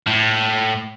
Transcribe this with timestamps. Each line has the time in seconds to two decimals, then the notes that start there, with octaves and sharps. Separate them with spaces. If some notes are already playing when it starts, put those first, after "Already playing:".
0.07 A2